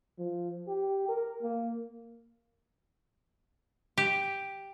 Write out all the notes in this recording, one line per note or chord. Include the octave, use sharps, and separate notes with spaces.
F3
G4
A#4
A#3
G4